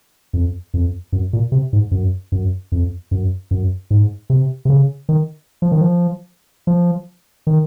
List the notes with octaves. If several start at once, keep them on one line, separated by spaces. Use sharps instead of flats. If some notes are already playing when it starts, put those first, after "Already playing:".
F2
F2
F#2
A#2
C3
G#2
F#2
F#2
F2
F#2
F#2
G#2
C3
C3
C#3
D#3
F3
D#3
F3
F3
D#3